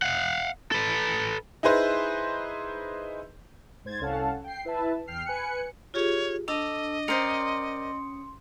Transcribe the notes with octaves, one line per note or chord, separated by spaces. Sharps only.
F5 F#5
A4 B4
D#4 E4 G#4 B4 C5
G#2 C5 G#6 A6
C2 C#4 A4 F5 F#5 A5
G5 C7
E4 B4 E5 A5
E2 G5 F6 C7
B4 G#5 F#6 C#7
F4 G4 G#4 C#5
D4 A4 D#5
C#4 A#4 C5 D5 C6 D#6 C#7